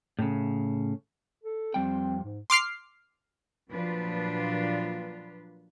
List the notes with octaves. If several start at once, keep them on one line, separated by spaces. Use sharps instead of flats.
A2 C#3
A4
F2 G3 C4 G5
G#2
C6 D6 F6 C7
A#2 F3 F#3 D4 F4 B4